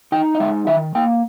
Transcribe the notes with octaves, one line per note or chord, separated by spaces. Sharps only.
D#4 G5
D#5
G#3 E5
D#3 E5
A#3 G5